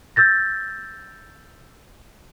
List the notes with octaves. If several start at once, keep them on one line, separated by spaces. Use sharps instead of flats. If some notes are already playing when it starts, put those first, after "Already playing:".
E6 G6 A6 A#6